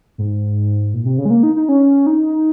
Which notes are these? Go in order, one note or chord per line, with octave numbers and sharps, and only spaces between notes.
G#2
A#2
C3
C#3
G#3
A#3
D#4
D#4
C#4
D#4